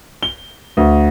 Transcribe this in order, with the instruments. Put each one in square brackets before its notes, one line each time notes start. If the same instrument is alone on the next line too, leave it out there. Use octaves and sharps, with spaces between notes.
[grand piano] G7
D2